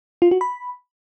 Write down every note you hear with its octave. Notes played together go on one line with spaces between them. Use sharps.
F4
F#4
B5